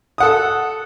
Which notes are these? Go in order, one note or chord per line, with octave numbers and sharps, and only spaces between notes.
A4 F#5 D#6